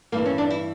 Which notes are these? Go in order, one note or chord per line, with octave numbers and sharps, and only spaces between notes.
G2 E3 A#3
C#4
D4
E4